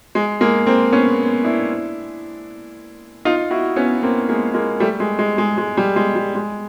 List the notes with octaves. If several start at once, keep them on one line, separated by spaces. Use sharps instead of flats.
G#3
G#3 A#3
A#3 C4
B3 C#4
D4 E4
D#4 F4
E4 F#4
B3 C#4
A#3 C4
G#3 A#3
G#3 A#3
G3 A3
G#3
G#3
G#3
G#3
G3
G#3
G3
G#3